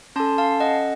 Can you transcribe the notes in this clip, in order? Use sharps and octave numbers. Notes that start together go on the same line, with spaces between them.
C#4 A4 A5 C6
F5 A5
D#5 F#5